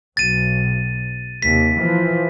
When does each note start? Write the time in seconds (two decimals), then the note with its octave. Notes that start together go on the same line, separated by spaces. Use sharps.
0.17 B1 A6 D#7
1.42 D#2 C3 B6
1.80 E3 F3